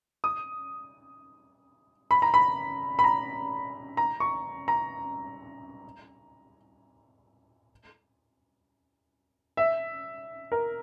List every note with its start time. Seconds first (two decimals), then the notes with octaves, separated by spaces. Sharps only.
0.24 D#6
2.11 B5
2.22 A#5
2.34 B5
2.99 B5
3.04 A#5
3.97 A#5
4.20 C#6
4.68 A#5
9.57 E5
10.52 A#4